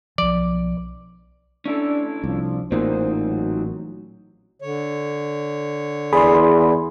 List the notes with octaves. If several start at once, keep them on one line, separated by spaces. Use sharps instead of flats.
B1 F3 D5
C#4 D4 E4 A4
C2 F3 D4
A1 A#2 C4 D#4 F#4 C5
F#3
D3 C#5
E2 G#4 D5 B5 C6